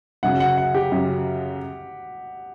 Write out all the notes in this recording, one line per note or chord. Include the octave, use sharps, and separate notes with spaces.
F#2 C#3 F#3 F#5
F#5
F#5
G4
F#2 C#3 F#3